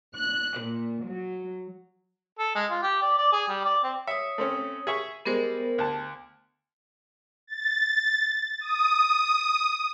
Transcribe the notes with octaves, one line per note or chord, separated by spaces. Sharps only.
F#6
A#2
F#3
A4
G#3
F4
G4
D5
D5
G#4
G3
D5
C4
C#5 E5 D#6
A3 C4 C#4
G#4 E5 C#6
G3 G#3 B3 A#4 C5
D2 A5
A6
D#6